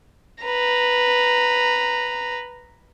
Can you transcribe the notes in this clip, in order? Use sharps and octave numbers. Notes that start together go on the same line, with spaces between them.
B4 A#5